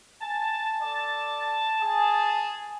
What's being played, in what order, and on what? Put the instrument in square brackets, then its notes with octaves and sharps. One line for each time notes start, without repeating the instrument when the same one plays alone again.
[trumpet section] G#5 [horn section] A5
[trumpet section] A4 D5
G#4